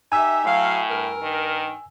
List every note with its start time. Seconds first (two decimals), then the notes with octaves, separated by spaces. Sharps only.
0.12 D#4 G4 E5 G#5 E6
0.45 A2 F#3 F5
0.89 G2 A#4
1.22 D#3